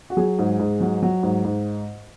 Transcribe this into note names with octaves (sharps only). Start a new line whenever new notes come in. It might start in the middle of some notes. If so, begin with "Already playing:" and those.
F#4
F#3 G#4
G#2
G#2
F#3
F#3
G#2
G#2